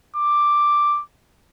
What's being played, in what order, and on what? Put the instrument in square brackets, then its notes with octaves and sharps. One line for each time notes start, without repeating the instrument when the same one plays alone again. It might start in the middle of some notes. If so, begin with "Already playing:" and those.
[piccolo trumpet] D6